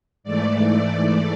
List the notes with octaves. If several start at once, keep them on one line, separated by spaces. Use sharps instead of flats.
G#2 E3 A3 D5